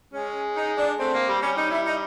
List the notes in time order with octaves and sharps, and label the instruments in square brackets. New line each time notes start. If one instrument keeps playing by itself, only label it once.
[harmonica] G#3 [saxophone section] C#4
[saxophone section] D#4
D4
[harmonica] A3 [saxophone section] C4
[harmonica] A#3
G3
[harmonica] G3 [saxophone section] C#4
[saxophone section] D#4
E4
D#4